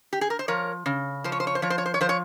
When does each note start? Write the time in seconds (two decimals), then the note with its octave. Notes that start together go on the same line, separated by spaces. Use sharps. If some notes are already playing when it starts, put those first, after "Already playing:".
0.13 G4
0.21 G#4
0.30 A#4
0.39 C5
0.48 F3 A#4 C#5
0.86 C#3
1.24 F3 C5
1.32 C#5
1.40 C5
1.47 C#5
1.55 C5
1.62 F3 C#5
1.70 C5
1.78 C#5
1.86 C5
1.94 C#5
2.01 F3 C5
2.09 C#5